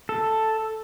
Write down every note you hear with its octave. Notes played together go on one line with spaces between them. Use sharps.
A4